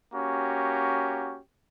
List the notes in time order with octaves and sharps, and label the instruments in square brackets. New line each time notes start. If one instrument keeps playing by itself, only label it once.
[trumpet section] A#3 C#4 F#4 G4